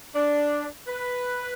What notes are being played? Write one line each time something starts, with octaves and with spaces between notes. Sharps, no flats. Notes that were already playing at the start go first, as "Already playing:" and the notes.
D4
B4